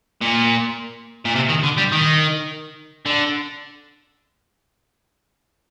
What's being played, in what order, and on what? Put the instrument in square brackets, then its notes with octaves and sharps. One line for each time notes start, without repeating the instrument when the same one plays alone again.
[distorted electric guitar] A#2
A#2
C3
D#3
D3
G3
D#3
D3